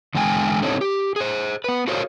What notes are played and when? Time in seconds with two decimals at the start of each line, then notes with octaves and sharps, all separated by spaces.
0.15 E2 D3 G#3 G5 G#5
0.62 C4 D4 D#4 A4 C5 C#5
0.81 G4
1.16 G#4 C5
1.64 B3 B4
1.88 F#4 A4 A#4 C5 C#5 F5